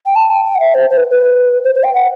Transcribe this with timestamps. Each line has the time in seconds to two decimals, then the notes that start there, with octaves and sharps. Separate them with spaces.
0.06 G5
0.16 A5
0.30 G5
0.44 G5
0.55 F#5
0.60 E5
0.74 C5
0.90 C5
0.97 B4
1.11 B4
1.64 C5
1.75 C5
1.83 G5
1.94 F#5